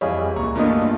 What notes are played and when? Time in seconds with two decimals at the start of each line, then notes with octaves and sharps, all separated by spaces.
0.01 F2 E3 G3 G#4 C#5 D#5 F5
0.36 C#2 A#2 A#5 C#6
0.55 G2 B2 E3 A3 A#3 D4 F4 D#5